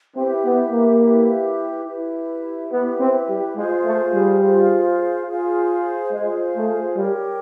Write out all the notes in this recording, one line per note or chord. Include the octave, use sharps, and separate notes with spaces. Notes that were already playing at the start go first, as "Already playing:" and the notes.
C4 E4 G4 B4 E5
B3
A#3
E4 G4 B4 E5
E4 G4 B4 E5
B3 E4 G4 B4 E5
C4
G3
G#3 F4 G#4 C5 F5
A3
G3
F4 G#4 C5 F5
F4 G#4 C5 F5
G#3 F4 G#4 C5 F5
A3
G3 G4 A#4 C#5